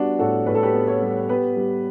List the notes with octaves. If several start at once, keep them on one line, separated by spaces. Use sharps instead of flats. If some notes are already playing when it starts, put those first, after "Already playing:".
Already playing: G3 B3 D4 F#4
A2 F#4 A4
A2 B4
A4
G4 B4
B3
A4 C#5
G3
B3 G4 B4
G3